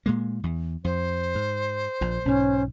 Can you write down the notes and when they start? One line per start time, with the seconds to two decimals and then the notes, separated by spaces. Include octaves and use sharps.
0.06 A#2 G#3 A#3
0.43 E2
0.84 F2 C5
1.35 G#2
2.01 A#1 A#2
2.25 B1 G#2 C#4